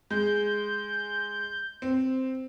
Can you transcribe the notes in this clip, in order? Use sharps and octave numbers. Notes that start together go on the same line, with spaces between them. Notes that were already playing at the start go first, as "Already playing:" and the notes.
G#3 G6
C4